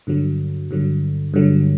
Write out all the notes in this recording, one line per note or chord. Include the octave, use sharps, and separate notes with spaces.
G2 D3 F#3
G2 D3 F#3
G2 D3 F#3